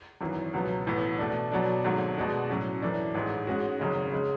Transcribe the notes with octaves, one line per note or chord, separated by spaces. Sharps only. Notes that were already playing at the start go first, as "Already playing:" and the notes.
G#1 F#2 E3
C#2 B2 F#3 B3
A1 A2 E3 B3
B2 A3 D4
B2 F#3 B3 D4
G#1 G#2 F#3 A3
B2 G#3 D4 F#4
A2 F#3 C#4 F#4
F#2 E3 A3 D4
A1 G#2 G#3
G#2 G#3 C#4 F#4
G#1 F#2 C#3 G#3
C#3 G#3